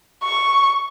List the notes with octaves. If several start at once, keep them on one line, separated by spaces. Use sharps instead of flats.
C#6